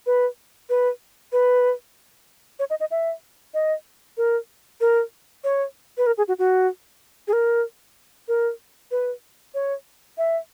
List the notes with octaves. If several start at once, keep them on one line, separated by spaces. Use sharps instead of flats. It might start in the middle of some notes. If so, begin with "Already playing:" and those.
B4
B4
B4
C#5
D#5
D#5
E5
D#5
A#4
A#4
C#5
B4
A#4
G#4
F#4
F#4
G#4
A#4
A#4
B4
C#5
E5